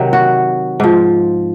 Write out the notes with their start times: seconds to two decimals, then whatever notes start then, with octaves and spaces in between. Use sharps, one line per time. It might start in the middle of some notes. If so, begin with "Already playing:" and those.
Already playing: C3 D#3 F#3
0.13 F#4
0.80 G#2 F3